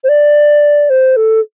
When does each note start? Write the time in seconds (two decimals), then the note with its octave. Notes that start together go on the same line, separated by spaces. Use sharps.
0.03 C5
0.08 D5
0.89 C5
1.16 A4